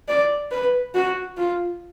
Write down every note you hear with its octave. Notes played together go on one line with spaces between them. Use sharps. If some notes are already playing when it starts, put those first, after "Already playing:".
D5
B4
F#4
F4